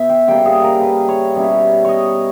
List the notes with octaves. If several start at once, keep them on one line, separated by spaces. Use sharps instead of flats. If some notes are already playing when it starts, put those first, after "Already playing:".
Already playing: B2 B3 E5
G5
C#3 G3 A#3 G5
G#4
A#4
B4
C#5
B2 G3 C#4 E4
C#5 D#5